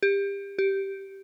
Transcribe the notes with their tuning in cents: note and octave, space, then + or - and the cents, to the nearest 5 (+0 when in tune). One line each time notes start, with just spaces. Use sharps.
G4 +25
G4 -10